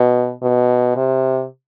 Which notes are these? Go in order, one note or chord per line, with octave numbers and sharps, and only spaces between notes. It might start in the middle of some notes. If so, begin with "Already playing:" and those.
Already playing: B2
B2
C3